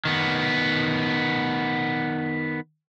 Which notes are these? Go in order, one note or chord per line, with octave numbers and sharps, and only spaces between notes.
D#3 B3